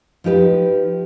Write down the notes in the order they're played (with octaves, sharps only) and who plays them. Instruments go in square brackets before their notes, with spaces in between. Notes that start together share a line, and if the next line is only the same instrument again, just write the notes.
[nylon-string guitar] F3 D#4 G4 B4